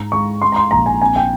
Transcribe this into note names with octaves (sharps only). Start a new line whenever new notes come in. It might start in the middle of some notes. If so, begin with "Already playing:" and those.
Already playing: G#2 G#3 A#5
G#3 C#6
G#3 C6
A#5
C6
A#1 A#5
G#5
C4 G#5
G5